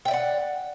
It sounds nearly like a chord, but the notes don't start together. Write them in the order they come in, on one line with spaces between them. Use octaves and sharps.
G5 E5 D5 F#5